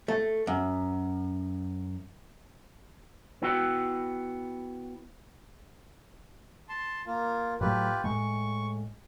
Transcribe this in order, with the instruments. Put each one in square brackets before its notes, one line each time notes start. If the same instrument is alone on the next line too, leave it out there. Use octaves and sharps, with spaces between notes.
[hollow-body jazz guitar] A3
F#2
[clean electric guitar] B3 E4 F#4 G5
[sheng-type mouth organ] A5 C6
A#3 F4
[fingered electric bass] A2 F#3 A3 [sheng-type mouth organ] F4 G4 B4
[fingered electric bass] A2 G#3 [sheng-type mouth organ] C#6